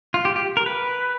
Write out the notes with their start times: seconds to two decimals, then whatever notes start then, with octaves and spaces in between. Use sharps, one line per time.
0.14 F4
0.25 G4
0.36 G4
0.57 A#4
0.66 B4